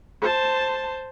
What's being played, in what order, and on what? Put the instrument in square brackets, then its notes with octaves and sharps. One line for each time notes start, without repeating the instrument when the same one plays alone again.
[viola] C5 A5